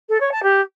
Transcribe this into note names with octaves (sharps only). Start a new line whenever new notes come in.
A4
C#5
A5
G4